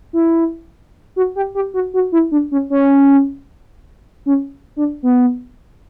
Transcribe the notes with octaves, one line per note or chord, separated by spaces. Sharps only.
E4
F#4
G4
G4
F#4
F#4
E4
D4
C#4
C#4
C#4
D4
B3